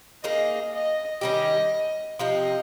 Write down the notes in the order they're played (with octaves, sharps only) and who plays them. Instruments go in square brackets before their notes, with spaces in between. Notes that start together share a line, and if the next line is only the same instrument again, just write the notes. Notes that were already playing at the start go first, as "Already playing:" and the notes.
[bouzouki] A#3 D#4 G#4 [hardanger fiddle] D#5
[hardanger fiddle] D#5
[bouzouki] D#3 G3 C#4 G4 [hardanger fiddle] D#5
[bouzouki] C3 F3 C4 D#4 [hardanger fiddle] D#5